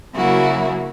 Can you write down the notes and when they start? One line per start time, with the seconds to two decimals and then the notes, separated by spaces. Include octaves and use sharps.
0.15 C#3 F#3 A#3 E4 F#4